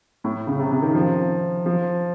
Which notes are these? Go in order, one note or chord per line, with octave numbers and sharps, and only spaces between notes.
A2
C#3
C3
C3
D#3
F3
F3